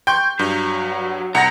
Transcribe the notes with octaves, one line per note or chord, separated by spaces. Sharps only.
G5 C6 C#6 G6
G2 F#3
C2 F#5 A#5 A#6